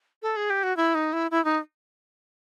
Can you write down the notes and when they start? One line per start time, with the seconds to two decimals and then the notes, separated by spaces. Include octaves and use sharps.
0.22 A4
0.36 G#4
0.50 G4
0.63 F#4
0.77 E4
0.95 D#4
1.13 E4
1.31 E4
1.45 D#4